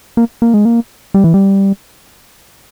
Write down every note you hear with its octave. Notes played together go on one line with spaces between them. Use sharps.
A#3
A#3
G#3
A#3
G3
E3
G3